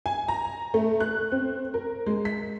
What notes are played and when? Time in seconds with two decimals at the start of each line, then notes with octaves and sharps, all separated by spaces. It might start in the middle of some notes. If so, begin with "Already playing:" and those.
0.06 G#5
0.28 A#5
0.74 A3
1.00 F#6
1.32 C4
1.74 A#4
2.06 G#3
2.25 B6